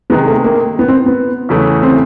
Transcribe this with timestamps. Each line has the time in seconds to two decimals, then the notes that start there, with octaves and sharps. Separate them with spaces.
0.10 C3 D#3 G#3 B3
0.27 A3
0.44 A#3
0.79 B3
0.88 C4
1.06 B3
1.49 E2 C#3 E3 A3
1.83 C4